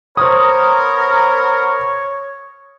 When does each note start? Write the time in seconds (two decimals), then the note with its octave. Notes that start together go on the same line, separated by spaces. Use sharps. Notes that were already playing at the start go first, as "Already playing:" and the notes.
0.17 B3 A#4 C5 C#5 D#6